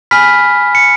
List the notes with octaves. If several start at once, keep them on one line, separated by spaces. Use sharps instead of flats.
G#5 B5 F6 B6
C#7